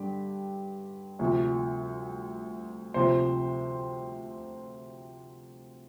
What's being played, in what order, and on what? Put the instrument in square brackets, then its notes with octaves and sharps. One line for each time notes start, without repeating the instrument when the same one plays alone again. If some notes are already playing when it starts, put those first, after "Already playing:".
Already playing: [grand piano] G2 D3 G4
D2 C3 F3
D2 C3 F3 C5